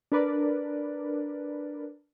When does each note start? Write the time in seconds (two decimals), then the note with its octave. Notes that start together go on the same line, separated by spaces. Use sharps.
0.12 D4 A#4 B4 D5